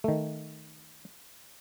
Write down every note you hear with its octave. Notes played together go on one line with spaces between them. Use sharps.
D#3 A3